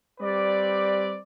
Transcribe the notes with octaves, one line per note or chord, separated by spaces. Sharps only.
G3 C4 B4 D5